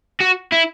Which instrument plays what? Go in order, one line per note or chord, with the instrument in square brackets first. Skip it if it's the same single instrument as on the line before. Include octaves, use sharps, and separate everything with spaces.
[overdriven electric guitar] F#4
E4